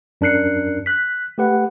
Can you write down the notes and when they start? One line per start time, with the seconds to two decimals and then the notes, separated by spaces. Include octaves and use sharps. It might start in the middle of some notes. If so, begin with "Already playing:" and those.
0.21 F#2 D4 A#4 F#6 C7 C#7
0.86 F#6 B6
1.38 A3 G4 B4 F#5